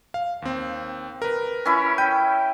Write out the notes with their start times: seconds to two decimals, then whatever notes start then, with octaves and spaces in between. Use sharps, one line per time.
0.14 F5
0.42 D#2 C4
1.22 A#4 B4
1.65 C#4 E4 B5
1.98 G5 G6 D#7